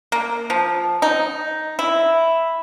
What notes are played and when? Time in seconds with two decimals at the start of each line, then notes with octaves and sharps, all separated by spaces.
0.12 A#3
0.50 F3
1.02 D#4
1.79 E4